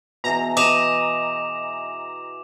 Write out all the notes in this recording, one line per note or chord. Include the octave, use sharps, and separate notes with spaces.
B2 E3 G#4 A#5
D#5 D6 E7 F7